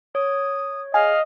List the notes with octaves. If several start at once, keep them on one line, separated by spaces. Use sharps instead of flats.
C#5 D#6
G#4 D#5 F5